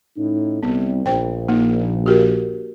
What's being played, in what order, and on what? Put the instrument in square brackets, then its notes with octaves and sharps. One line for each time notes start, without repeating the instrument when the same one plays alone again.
[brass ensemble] A2 C#4 D#4
[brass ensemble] C2 [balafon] B3
[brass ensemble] A#1 [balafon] C5 G5
[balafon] A#3 D#4
F#4 G4 A#4